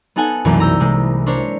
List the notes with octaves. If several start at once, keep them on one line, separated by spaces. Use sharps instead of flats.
B3 D#4 A4 F#5 G#5
C2 F#2 B2 E3 A#3
A#5 E6 G6
C3 G#3
D4 A#4 C5 C#5